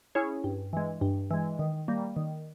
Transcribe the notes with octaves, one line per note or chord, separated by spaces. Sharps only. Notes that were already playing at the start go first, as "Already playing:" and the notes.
C#4 E4 G#4 C#5
G2
E3 G#3
G2
E3 G#3
D#3
G3 A#3
D#3